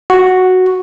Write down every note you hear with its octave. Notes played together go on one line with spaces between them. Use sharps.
F#4